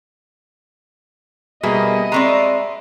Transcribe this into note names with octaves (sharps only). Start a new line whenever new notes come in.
B2 G3 A#3 G#4 D#5 E5 B5
G#3 C4 D5 E5 A#5 B5 C#6 C7